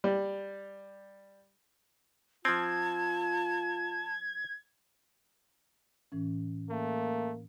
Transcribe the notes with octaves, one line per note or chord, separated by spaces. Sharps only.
G3
F3 C4 F4 A5 G#6
A2 E3 C#4
A3 A#3